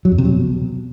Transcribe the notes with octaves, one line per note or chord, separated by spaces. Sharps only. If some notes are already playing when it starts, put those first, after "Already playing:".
F#3
F2
C3
F#3
B2